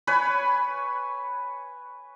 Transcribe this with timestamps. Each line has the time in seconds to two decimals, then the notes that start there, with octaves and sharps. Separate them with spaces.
0.07 B4 C#5 G#5 B5